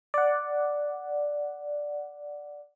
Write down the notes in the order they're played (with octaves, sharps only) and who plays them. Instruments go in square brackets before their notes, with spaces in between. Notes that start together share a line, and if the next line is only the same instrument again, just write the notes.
[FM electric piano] D5 F#5